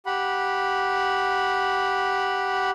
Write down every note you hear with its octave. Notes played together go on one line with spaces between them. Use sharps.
G4 F#5 B5